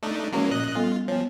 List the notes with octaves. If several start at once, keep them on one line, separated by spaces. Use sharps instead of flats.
A3 D4 D#4
E3 F3 G#3 A#3 C#4 F#4
A#2 D#5 F#6
G3 B3 F4 A4
F3 B3 C#5